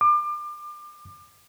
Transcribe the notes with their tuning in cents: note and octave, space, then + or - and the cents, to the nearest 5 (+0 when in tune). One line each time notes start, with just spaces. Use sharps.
D6 +30